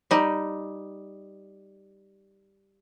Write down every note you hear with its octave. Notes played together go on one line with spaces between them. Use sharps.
G3 D#4